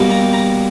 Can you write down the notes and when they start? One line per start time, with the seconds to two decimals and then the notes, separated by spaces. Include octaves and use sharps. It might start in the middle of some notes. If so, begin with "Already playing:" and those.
Already playing: B2 G3 A#3
0.10 A#5
0.33 A#5